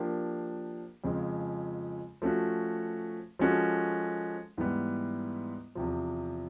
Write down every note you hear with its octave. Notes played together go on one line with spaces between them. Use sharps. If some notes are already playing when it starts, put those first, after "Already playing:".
Already playing: F3 A#3 D4 G4
F2 C#3 F3 G#3
F3 A3 C#4 F#4
F3 G#3 C#4 F#4 A4
G#2 E3 G3 B3
E2 C3 F3